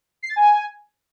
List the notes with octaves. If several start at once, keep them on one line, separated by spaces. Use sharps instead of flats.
C7
A6
G#5